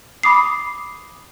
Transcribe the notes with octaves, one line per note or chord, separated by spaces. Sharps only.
B5 D6 D#6 C7